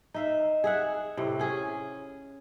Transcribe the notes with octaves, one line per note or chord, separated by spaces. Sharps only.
D#4 E5 F5
G#4 E5 F#5
A2 C3
C#4 G#4